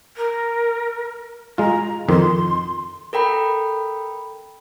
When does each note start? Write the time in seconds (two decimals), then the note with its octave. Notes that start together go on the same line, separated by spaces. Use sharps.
0.16 A#4
1.58 G#3 F4 A#5
2.09 F2 D#3 C6
3.13 A4 A#4 G5 B5